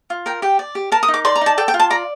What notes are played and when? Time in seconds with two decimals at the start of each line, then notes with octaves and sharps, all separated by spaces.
0.10 F4
0.26 A#4 G5
0.42 G4 G5
0.59 D5
0.75 G4
0.92 A#4 A5
1.03 D#6
1.08 D#4
1.14 D6
1.25 D5 C6
1.36 A#5
1.41 D#4 A5
1.58 A4 G5
1.68 G5
1.74 F4
1.80 A5
1.90 D5 A#5